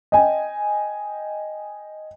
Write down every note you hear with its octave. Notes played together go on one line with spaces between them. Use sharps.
D#5 G5 G#5